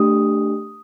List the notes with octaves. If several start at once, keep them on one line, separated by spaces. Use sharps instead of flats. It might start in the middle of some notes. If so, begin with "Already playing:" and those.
Already playing: A3 D4 G4 D#6